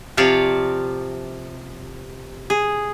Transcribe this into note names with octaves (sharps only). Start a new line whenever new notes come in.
C3 F3 C#5 D5 F5
G#4